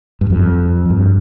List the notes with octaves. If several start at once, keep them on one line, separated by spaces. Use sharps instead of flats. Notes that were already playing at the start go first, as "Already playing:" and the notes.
G2
F2
G2